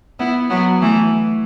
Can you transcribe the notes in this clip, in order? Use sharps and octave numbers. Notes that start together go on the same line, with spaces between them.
B3 E4
F#3 B3
E3 A3